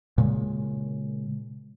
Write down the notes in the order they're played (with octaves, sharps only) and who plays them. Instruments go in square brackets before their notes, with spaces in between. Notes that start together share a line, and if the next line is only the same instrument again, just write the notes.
[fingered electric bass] A#2 C#3 G#3